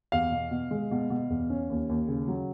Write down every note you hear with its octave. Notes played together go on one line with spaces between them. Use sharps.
E2 F5
B2
B2
G#3
B2
B2
E2
C#4
D#2
D#2
C#3
F#3